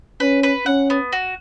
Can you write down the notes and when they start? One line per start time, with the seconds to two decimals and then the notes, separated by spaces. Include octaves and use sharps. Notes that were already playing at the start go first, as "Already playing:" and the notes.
0.20 C#4 B4
0.43 B4
0.66 C#4 F#5
0.90 B3
1.12 F#4